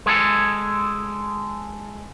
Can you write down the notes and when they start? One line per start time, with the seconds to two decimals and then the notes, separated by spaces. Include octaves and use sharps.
0.06 G#3 G#4 A4